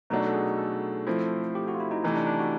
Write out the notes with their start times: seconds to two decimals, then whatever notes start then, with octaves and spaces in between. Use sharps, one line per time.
0.10 B2 F#3 A3 D4 D#4 F#4
0.27 A4
0.34 G#4
0.58 A4
1.07 F3 A3 C4 E4
1.55 G4
1.68 F#4
1.74 F4
1.80 E4
1.91 D#4
2.03 C3 E3 A3 D#4
2.16 D4
2.27 D4
2.39 F#4